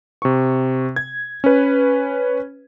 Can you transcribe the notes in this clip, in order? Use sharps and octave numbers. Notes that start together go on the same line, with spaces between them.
C3 C#6
G#6
C#4 B4